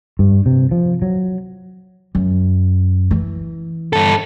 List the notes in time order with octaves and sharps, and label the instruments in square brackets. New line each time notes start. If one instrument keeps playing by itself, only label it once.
[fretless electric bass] G2
C3
F3
F#3
[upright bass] F#2
E3
[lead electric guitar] G2 A4